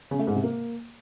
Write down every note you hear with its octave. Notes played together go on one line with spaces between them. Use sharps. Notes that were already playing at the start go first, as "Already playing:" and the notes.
C#3
A3
G#2
C3
A#3